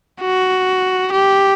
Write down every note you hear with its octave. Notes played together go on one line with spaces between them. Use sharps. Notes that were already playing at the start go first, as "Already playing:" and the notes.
F#4
G4